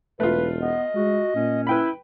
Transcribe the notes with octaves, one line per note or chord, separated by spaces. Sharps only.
E1 A3 F4 B4
B3 D#5
G#3 F#4
A#2 C#4
E4 B4 G5 B5